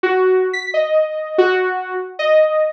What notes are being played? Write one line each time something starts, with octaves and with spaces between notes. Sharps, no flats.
F#4
B6
D#5
F#4
D#5